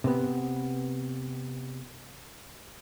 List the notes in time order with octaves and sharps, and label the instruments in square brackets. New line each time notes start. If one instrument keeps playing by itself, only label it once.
[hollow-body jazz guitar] C3 B3